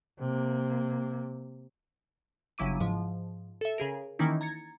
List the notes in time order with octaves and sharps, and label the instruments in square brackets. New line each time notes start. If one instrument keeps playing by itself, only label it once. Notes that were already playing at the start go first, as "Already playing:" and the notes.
[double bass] C3 A#3
[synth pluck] G1 C#3 F#3 E4 D6 D#7
G#2 F3
A4 E5
C#3 G#4 A#4
D#3 E3 A#3 C#4 D#4 E4
A#5 G#6 A6 C#7